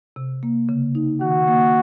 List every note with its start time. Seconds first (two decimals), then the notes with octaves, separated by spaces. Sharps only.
0.16 C3
0.43 A#3
0.69 C#3
0.95 D#4
1.21 D#3 F#4
1.48 A#3